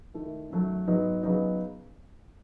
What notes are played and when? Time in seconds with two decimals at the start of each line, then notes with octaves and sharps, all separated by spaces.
0.14 D#3 A3 E4
0.50 F#2 D#3 F#3 A3
0.87 G#2 F#3 B3 D#4
1.23 C#3 F#3 B3 D#4